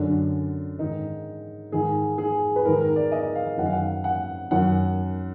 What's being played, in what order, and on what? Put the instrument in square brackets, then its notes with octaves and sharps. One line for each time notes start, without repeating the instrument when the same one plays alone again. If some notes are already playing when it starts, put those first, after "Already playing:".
Already playing: [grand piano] F#2 D3 D4
G#2 D#3 D#4
G#2 D#3 G#4
G#4
B4
G#2 D#3 A#4
A#4
D5
D#5
F5
F#2 D#3 F#5
F5
F#5
F#5
F#2 D#3 F#5